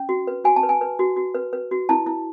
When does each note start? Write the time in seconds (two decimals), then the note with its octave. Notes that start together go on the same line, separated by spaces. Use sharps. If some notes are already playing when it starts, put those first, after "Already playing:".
Already playing: C#4
0.09 F#4
0.27 B4
0.44 F#4 G#5
0.56 A5
0.63 B4
0.69 G#5
0.81 B4
0.99 F#4
1.16 F#4
1.35 B4
1.53 B4
1.71 F#4
1.89 E4 A5
2.06 E4